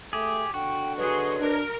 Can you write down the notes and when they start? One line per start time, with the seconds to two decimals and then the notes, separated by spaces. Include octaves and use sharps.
0.13 A3 G4 G#4
0.54 D3 F#4 G5
0.97 F#3 G#4 B4 C#5 D#5 C6
1.39 D4 A#4